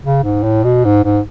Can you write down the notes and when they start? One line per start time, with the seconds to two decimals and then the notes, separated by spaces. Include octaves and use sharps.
0.03 C#3
0.23 G#2
0.44 A2
0.64 B2
0.85 G#2
1.05 G#2